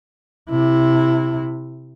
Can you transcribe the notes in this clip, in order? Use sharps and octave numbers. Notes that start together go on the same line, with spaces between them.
C3 E4